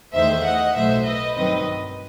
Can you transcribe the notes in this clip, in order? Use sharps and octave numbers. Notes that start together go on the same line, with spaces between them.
E2 D#3 A3 C5 E5
D#5 F#5
B1 A2 F#3 A3 C5 E5
B4 D#5
G2 D#3 F#3 C4 B4 D#5